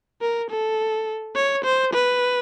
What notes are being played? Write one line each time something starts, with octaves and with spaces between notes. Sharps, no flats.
A#4
A4
C#5
C5
B4